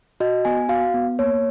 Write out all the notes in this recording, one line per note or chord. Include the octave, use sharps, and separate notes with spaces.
F#4 D#5
B3 G#5
F#4 F5
B3
A#3 C#5